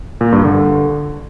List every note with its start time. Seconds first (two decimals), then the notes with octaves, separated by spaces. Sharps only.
0.21 A#2
0.32 G2
0.44 D3